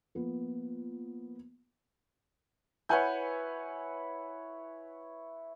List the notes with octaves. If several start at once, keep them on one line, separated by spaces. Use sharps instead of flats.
F3 A#3 B3
E4 B4 C#5 F#5 G#5 G6